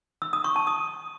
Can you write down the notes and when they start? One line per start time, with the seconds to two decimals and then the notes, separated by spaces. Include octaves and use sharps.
0.22 E6
0.33 D#6
0.44 C#6
0.56 A5
0.67 D#6